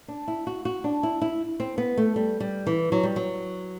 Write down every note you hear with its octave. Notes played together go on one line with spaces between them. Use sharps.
D4
E4
F#4
F#4
D4
E4
E4
C4
B3
A3
G3
G3
E3
F#3
G3
F#3